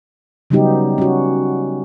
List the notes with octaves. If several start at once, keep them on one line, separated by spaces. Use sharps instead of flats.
C#3 F#3 G3 B3 D#4 G4
C#4 F#4